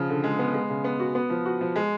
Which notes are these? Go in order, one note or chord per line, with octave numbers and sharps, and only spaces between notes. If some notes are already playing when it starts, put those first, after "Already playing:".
Already playing: C#3 F3
D3
G#3
B3
G#3
C#3
B3
F#4
B3
F3
F#4
F3
G#3